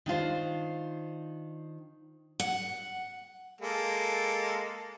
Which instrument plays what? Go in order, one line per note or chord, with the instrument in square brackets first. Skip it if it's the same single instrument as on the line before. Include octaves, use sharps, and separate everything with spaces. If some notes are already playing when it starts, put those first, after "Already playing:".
[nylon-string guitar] D#3 D4 F4 C5
[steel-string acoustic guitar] F#5
[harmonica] G#3 A#3 A4